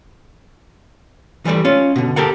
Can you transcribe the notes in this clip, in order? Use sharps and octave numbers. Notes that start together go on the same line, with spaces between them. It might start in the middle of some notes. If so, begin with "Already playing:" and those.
E3 F3 G3 A3
C#4 F4
B2 D3
G4 A4 A#4 F#5